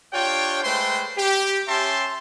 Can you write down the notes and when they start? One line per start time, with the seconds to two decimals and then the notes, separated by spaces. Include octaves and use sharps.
0.13 D4 F4 G4 C#5 G5
0.64 G#3 A3 B4 C5 G5 C6
1.18 G4
1.68 C#4 G4 E5 A5 C6